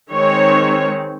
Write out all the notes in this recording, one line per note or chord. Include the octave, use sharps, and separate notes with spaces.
D#3 G#3 C4 C#5